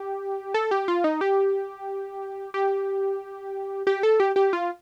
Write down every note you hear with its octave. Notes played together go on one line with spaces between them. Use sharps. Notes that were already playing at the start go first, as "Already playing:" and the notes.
Already playing: G4
A4
G4
F4
D#4
G4
G4
G4
A4
G4
G4
F4